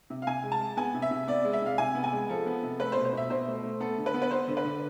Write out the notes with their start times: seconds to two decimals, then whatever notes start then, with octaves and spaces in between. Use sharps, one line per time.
0.10 C3
0.22 F5
0.27 C3 G#5
0.44 G#3
0.52 A5
0.60 G#3
0.77 B3 G#5
0.94 C3
1.02 E5
1.11 C3
1.27 B3 D5
1.45 G#3
1.53 E5
1.62 C3 F5
1.78 C3 G#5
1.95 B3
2.04 G#5
2.13 G#3
2.29 F3 A4
2.46 B3
2.63 C3
2.80 A3 B4
2.92 C5
2.97 B2
3.05 C5
3.13 B2 E5
3.30 B2 C5
3.47 A3
3.63 A3
3.80 B3 A4
3.98 D3
4.06 B4
4.14 B3
4.22 B4
4.31 B3 C5
4.48 D3
4.57 B4
4.65 D3